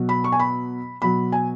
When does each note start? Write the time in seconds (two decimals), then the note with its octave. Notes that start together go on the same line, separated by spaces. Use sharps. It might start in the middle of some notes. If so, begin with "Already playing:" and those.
Already playing: B2 F#3
0.09 B5
0.24 C#6
0.32 G#5
0.40 B5
1.02 B2 F#3 B5
1.32 G#5